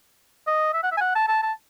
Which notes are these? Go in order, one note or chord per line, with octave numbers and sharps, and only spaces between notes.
D#5
E5
F#5
E5
G#5
F#5
A5
A5
A5